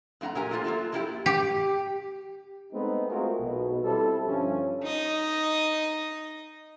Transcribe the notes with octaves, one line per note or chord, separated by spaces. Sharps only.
F2 A3 F4 F#5 A#5
A#2 F#3 G4 A#4 G#5 A#5
A3 A#3 F4 C5
F#3 A#3 F4 A4
F2 G#3 A#3 E4 G4 A4
G4
G#3 A3 B3 C4 D#4
A3 C4 F4 F#4 G#4 A#4
B1 B2
G3 C4 E4 A4
G2 D3 F3 C#4
D#4 D#5